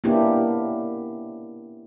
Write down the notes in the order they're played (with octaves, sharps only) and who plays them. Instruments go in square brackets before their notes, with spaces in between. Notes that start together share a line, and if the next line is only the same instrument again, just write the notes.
[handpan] A#3 B3 C#4 D4 E4 G4